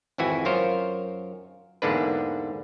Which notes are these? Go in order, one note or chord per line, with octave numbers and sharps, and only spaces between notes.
G#1 F2 E3 E4 F#4 G#5
F#2 F4 A#4 C5 C#5
E2 G#2 D3 A#3 D4 B4